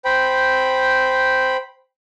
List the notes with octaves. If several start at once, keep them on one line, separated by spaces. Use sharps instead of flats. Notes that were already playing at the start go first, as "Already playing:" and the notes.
C5 G5 B5